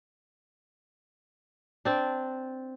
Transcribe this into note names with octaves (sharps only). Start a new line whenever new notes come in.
C4 D4